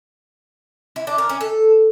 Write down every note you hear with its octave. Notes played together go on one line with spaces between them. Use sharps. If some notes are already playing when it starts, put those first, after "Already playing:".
E4
D4
A#4
C#4
A4